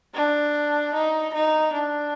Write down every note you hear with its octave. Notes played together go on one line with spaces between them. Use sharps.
D4
D#4
D#4
D4